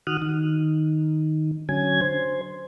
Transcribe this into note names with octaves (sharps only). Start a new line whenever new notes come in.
D#3 F#4 D#6 F6 F#6
D#3
D3 F#3 C#4 G#5 G#6
C5